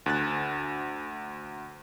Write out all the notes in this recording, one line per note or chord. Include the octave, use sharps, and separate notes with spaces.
D2 F#6 A6